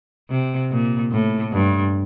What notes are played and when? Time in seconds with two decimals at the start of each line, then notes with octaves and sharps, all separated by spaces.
0.30 C3
0.71 A#2
1.12 A2
1.52 G2